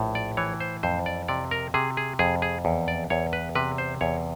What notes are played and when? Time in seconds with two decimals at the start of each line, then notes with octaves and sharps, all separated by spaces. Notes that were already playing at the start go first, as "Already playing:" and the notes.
Already playing: A#1 A2
0.15 D5
0.37 E3 C#5
0.60 C5
0.83 F2 C5
1.06 D5
1.28 C3 D5
1.51 A#4
1.74 C3 G#4
1.97 G#4
2.19 F2 G#4
2.42 G#4
2.65 E2
2.88 D5
3.10 E2 C#5
3.33 B4
3.55 C3 B4
3.78 C5
4.01 E2 C#5